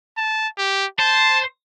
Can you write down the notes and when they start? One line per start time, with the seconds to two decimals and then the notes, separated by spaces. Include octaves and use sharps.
0.17 A5
0.58 G4
0.99 C5 A5